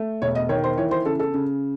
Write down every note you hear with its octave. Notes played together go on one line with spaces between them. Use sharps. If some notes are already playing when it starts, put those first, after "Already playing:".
Already playing: A3
E1 C#5
D#5
D#3 C#5
C5
E3 C#5
C5
C#3 A4
A4
C#3